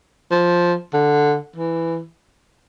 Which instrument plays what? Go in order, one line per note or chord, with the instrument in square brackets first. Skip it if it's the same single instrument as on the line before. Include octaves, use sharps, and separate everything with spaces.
[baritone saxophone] F3
D3
E3